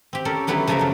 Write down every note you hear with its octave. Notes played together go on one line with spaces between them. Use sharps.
C4 G4
C#4 A4 A#4 D5
D3 F#3 B3 E4 G4
C#3 F3 A3 A#4 E5 F5
F#2 F#3